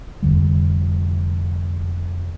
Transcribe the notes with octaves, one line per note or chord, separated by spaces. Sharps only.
F1 F2 D3 G3